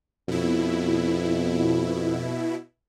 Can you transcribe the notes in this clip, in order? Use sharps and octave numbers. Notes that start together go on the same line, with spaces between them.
F2 B2 E4